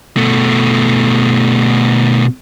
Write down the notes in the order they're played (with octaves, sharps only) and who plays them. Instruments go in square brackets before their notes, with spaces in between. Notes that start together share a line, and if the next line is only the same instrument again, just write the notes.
[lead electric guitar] B2 A3